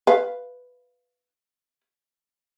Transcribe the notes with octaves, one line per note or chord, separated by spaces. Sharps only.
B4 F5